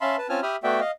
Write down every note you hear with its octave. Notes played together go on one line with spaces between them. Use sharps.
C#4 E5 F5 A5 B5 C6
B4 A5
C4 C#4 F4 G#5 A5 F6
G4 E5 B5 D#6 F6
A3 B3 F#4 D5 E5 G5
D#5 F5